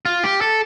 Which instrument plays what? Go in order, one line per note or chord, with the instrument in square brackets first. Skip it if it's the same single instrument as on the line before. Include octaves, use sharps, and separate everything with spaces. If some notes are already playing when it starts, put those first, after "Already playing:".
[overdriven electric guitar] F4
G4
A4